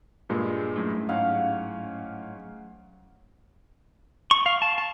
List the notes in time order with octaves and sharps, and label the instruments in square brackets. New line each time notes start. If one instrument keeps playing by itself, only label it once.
[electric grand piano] G2 A#2 G#3
[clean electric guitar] F#2 A2
[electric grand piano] G#2 C#4 [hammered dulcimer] F5 F#5
[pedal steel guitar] C#6
F5
A5
A5